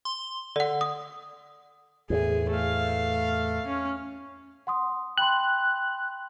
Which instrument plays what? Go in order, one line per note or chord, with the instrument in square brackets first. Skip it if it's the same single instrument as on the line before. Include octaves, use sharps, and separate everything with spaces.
[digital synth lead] C6
[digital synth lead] D3 [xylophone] D5 F#5
[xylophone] D#6
[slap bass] E2 A2 [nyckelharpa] G#4
[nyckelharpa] A3 F5
C#4
[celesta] F#5 C6 D#6
[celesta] G5 B5 C6 [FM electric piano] F#6